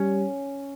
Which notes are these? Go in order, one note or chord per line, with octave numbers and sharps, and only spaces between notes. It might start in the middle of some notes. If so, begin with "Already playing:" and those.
Already playing: G3 C#4